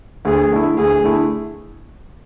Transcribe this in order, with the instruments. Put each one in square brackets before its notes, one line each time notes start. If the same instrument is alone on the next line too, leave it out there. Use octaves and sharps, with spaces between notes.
[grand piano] D2 [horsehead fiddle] G#4
[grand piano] D3 A3 E4
[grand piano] D2 [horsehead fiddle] G#4
[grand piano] D3 A3 E4